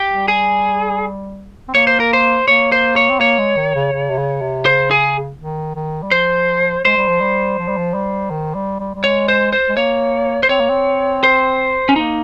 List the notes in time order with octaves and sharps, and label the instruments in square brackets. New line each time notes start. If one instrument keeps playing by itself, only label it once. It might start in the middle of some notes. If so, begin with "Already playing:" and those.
Already playing: [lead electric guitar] G4
[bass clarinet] G3
[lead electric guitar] G#4
[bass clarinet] C4
[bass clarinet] A#3 [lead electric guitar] C#5
[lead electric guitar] C5
A#4
C5
[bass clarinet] A#3 [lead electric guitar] C#5
[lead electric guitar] C5
C#5
[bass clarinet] C4
[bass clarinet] A#3 [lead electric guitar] C#5
[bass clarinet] G#3
D#3
C#3
C#3
C3
C#3
C3
[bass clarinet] C#3 [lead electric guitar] C5
[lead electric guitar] G#4
[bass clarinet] D#3
D#3
G3
[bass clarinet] F3 [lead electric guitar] C5
[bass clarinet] G#3 [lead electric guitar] C5
[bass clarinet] G3
F3
G3
F3
G3
F3
G3
D#3
G3
G3
G3
[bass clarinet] G#3 [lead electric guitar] C#5
[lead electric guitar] C5
C5
[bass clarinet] G#3
[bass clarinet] A#3 [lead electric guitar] C#5
[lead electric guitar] C5
[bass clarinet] C4 [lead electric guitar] C#5
[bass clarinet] A#3
C4
[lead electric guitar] C5
C#4
[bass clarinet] A#3 [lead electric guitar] D#4